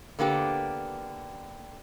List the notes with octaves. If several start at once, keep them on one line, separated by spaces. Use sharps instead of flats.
D3 A#3 B3 G4